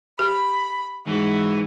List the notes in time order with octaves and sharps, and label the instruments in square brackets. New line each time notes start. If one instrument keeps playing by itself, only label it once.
[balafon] G4 [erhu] B5
[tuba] G#2 [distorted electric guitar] E3 [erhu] F#4